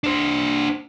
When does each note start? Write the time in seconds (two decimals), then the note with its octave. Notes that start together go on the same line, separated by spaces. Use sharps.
0.04 D4 C5